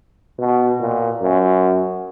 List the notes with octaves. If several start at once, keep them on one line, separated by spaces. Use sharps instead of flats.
B2
A#2
F#2